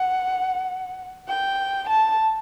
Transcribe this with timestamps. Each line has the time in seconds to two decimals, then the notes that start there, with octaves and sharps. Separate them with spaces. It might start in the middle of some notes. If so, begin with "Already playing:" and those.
Already playing: F#5
1.29 G5
1.89 A5